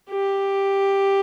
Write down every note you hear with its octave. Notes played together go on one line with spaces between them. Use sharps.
G4